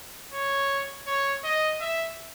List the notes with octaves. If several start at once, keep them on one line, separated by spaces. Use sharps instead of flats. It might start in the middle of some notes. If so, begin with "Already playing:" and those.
C#5
C#5
D#5
E5